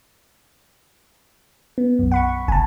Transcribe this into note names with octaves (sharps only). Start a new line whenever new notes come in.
B3
B1 F#2
F#5 B5 C#6
F#1 G#5 A5